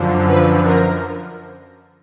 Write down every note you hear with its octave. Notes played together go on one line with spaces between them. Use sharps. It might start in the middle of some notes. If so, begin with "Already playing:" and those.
Already playing: F#2 D3 F3
B4
A#4